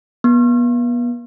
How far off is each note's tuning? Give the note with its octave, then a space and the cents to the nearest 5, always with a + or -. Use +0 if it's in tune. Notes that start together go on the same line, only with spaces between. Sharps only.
B3 -35